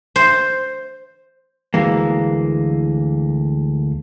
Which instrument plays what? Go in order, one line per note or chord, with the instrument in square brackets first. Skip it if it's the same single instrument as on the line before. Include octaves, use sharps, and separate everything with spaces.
[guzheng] C5
[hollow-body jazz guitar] D2 E3 G#3 A#3